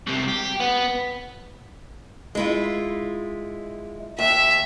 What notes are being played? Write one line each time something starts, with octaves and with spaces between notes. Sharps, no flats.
C2 C3
G4
B3
G#3 E4 F4
D#2 E5